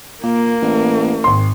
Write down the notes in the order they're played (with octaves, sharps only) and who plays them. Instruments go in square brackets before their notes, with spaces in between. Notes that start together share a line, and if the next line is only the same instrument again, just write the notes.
[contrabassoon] A#2 [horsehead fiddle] A#3
[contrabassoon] A1
[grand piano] G#1 C6